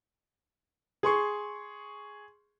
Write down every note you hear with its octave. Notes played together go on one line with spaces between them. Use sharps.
G#4 C6 C#6